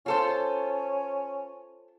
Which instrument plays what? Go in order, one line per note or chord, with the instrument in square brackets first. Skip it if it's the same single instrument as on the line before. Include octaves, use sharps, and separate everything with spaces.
[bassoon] C#4 [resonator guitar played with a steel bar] F4 A4 C5